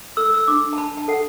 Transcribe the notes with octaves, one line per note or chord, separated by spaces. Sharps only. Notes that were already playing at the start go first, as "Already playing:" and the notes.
A4 E6
E6
D4 D6
A5
D4 B5
A5
A4 F#5